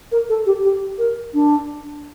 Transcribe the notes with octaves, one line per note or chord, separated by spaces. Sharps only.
A#4
A4
G4
G4
A#4
D4